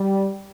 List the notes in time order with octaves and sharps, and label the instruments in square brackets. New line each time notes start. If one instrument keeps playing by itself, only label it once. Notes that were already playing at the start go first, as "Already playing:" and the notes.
Already playing: [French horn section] G3